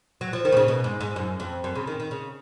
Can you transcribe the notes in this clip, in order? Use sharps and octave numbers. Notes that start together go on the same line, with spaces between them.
F#3
F3
D#3
B2
C#3
B2
G#2
G#2
F#2
F2
F#2
C#3
D#3
D#3
C#3